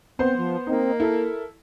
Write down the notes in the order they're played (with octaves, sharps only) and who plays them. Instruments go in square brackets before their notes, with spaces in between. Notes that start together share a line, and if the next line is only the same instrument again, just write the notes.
[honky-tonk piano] B3 C5 C6 [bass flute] C4
[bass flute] F3
[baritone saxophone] A#3 [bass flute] C4 [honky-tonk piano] D#4
[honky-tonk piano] E4 A4 [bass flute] A#4